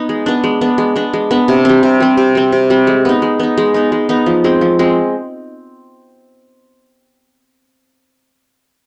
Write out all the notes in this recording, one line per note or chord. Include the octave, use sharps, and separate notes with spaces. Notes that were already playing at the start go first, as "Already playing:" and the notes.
Already playing: B3 D#4
G#3
B3 D4
G#3
B3 D4
G#3
B3 D4
G#3
B3 D4
C3
G3 C4
C3
G3 C4
C3
G3 C4
C3
G3 C4
G#3
B3 D#4
G#3
B3 D#4
G#3
B3 D#4
G#3
B3 D#4
F3
G#3 C4
F3
G#3 C4